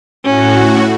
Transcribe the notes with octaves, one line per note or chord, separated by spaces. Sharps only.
A2 C#4 F#4